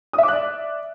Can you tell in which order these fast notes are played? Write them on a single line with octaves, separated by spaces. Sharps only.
D#6 E5 D6 F#6 D5